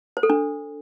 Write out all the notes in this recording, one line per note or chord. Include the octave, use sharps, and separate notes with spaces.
C5
A4
D4